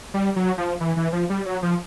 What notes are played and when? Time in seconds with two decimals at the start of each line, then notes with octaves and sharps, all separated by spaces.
0.14 G3
0.36 F#3
0.58 F3
0.81 E3
0.97 E3
1.13 F3
1.30 G3
1.46 F#3
1.63 F3